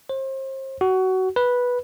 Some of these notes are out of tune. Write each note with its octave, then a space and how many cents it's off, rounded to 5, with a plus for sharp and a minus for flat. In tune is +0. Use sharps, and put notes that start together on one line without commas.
C5 +35
F#4 +20
B4 -10